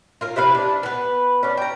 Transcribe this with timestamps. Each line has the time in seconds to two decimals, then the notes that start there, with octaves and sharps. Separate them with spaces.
0.21 F4 A#4
0.36 C3 E4 B4 F5
0.55 D4
0.83 B3 B4
1.43 C#4 D4
1.57 G5 A#5